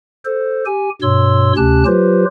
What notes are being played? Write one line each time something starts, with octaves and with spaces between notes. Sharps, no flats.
A4 C5
G4 G#5
G2 B2 C#5 C6 E6
D2 C3 C#4 G4 A5 F#6
F#3 F4 G4 B4 C5